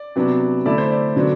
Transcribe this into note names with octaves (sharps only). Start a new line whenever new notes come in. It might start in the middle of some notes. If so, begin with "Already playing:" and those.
Already playing: D5
C3 F#3 B3 D4
D3 A3 E4 D5
C5
D5
D3 F#3 B3 D4